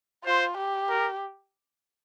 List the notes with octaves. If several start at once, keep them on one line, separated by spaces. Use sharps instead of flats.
F4 C5
G4
A#4